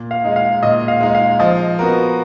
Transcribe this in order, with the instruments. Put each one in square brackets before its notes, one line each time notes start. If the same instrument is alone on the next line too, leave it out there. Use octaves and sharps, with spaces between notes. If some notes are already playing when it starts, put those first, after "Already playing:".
Already playing: [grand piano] A#2
[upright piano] F5
[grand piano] G#3 D#4
[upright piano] F5
[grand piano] A#2 [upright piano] D#5
[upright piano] F5
[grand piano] G#3 D#4
[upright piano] F5
[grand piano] F3 [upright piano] D#5
[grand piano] B3 F#4 A#4